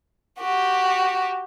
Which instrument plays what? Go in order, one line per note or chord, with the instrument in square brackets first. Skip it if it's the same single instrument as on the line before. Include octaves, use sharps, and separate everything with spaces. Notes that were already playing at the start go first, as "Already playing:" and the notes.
[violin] F#4 G4